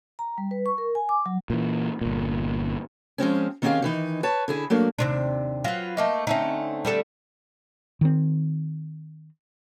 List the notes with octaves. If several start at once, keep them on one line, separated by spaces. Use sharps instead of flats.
A#5
G3
B4
C#6
A#4
G#5
D6
F#3
A#2 E3
G1 A#2
F3 G#3 C4 C#4
D#3 C4 C#4 G4 G#4 F5
D#3 E3 D#4
B4 C#5 A5
D3 E4 G#4
F#3 A3 A#3 D4
D#2 C3 D4
F#3 F4 B4
A3 A#3 D#4
D3 A3 C4 C#4 D#4
G3 D4 A4
D#3 C4